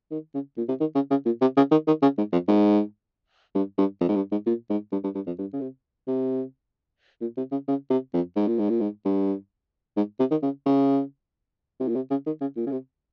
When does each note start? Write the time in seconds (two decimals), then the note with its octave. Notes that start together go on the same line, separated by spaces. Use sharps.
0.11 D#3
0.34 C#3
0.58 A#2
0.69 C3
0.80 D#3
0.95 C#3
1.10 C#3
1.26 A#2
1.41 C3
1.57 C#3
1.72 D#3
1.87 D#3
2.02 C#3
2.18 G#2
2.33 F2
2.48 G#2
3.55 G2
3.78 G2
4.01 F2
4.09 G#2
4.16 G2
4.32 G#2
4.46 A#2
4.70 G#2
4.92 G2
5.04 G2
5.15 G2
5.27 F2
5.39 G2
5.53 C#3
5.61 C3
6.08 C3
7.21 A#2
7.37 C3
7.52 C#3
7.68 C#3
7.90 C3
8.14 F2
8.36 G#2
8.48 A#2
8.59 G#2
8.70 A#2
8.81 G#2
9.05 G2
9.97 G#2
10.19 C3
10.31 D#3
10.43 C#3
10.66 C#3
11.80 C3
11.88 A#2
11.96 C3
12.11 C#3
12.26 D#3
12.41 C#3
12.57 A#2
12.67 C#3
12.72 C3